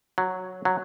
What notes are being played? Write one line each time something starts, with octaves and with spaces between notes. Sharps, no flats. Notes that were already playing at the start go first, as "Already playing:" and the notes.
F#3
F#3